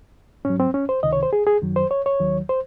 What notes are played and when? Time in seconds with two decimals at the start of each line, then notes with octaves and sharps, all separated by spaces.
0.45 G#2 F#3 C#4
0.60 C4
0.74 C#4
0.89 C5
1.03 C#2 C3 D#3 D#5
1.13 C#5
1.23 C5
1.33 G#4
1.47 G#4
1.62 F#2 D#3 F#3
1.76 C5
1.91 C#5
2.06 C#5
2.20 D#2 D#3 F#3
2.49 C5